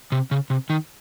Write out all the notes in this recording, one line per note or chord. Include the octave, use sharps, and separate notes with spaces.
C3
C#3
C3
D#3